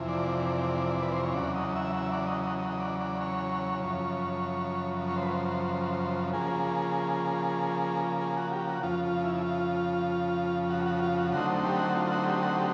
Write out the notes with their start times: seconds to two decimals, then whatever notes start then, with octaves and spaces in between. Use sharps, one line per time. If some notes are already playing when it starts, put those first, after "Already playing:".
Already playing: F2 C3 E3
0.08 D5
1.02 B4
1.13 C5
1.23 C#5
1.33 E2 C#3 F#3 D5
1.55 D#5
1.76 E5
1.96 E5
2.12 D5
2.27 D#5
2.43 D#5
2.58 D#5
2.70 D#5
2.80 D5
3.00 D5
3.21 C#5
3.83 F#2 C#3 F3
5.08 C#5
5.16 C5
5.22 B4
5.30 C5
6.33 C#3 F3 A#3 G#4
8.21 G#4
8.37 F#4
8.52 G4
8.67 F#4
8.83 F2 C#3 F3 F4
9.05 F4
9.24 E4
9.46 F4
10.70 F#4
10.86 F#4
11.02 F4
11.18 F#4
11.33 D3 F#3 A3 C4 D#4 F#4
11.65 G4
11.79 F#4
11.95 F4
12.06 F4
12.11 F#4
12.26 G4
12.42 F#4
12.58 G4